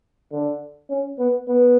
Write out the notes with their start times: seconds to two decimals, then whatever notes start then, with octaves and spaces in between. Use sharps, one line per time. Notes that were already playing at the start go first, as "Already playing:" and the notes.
0.32 D3
0.90 C#4
1.19 B3
1.48 B3